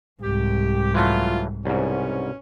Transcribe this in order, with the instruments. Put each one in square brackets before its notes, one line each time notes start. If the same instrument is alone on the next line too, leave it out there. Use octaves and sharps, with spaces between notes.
[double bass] C2 G#2 [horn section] G4
[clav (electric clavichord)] E3 F#3 A3 [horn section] F4
[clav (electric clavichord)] C2 G#2 [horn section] B2 C#4